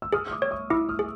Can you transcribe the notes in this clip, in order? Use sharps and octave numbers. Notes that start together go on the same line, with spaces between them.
E6
G#4 D#6 F6
F6
D6 E6
C#5
C#6 D#6
E4 D6 E6
D#6 F6
G#4